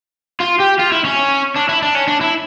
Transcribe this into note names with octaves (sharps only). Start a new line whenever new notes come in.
F4
G4
F4
E4
C#4
D4
E4
D4
C#4
D4
E4